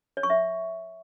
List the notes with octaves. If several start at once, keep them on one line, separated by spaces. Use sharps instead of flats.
C#5
C#6
E5